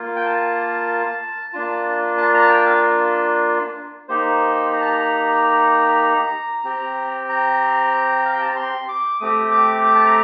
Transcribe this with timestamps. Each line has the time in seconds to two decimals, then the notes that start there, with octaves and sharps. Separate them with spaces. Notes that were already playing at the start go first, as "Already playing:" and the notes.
Already playing: A#3 F4
0.16 G5
0.26 A5
1.53 A#3 D4 F4
2.17 A5
2.34 A#5
2.42 A5
2.49 G5
2.66 F5
4.09 A#3 D#4 G4 C5
4.73 A#5
4.81 A5
4.88 A#5
6.65 C4 G4
7.29 A#5
8.25 F5
8.33 G5
8.41 A5
8.48 A#5
8.56 C6
8.89 D6
9.20 A3 C4 G4 D#6
9.52 D6
9.84 D6
9.95 A5
10.06 A#5